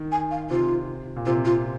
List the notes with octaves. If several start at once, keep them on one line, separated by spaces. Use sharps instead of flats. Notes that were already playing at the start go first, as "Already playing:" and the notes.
Already playing: D#3
G#5
F5
C3 F4
A#2
C3 F4
F4